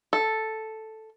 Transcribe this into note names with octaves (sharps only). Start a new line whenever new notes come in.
A4